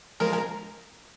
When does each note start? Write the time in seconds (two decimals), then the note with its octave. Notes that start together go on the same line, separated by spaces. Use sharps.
0.20 F3 G#3 A#4
0.33 A#4